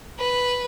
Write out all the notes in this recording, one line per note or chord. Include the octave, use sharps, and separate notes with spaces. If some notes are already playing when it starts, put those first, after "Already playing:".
B4